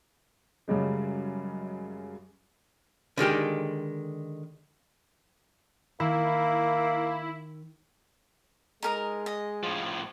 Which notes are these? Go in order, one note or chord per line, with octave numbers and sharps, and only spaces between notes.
F#2 C#3 G3 G#3
D3 D#3 G#3 G4
D#3 A#3 E4
G#3 D#4 A#4 D#5
D#5
A2 F3